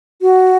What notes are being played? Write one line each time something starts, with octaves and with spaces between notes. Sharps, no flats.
F#4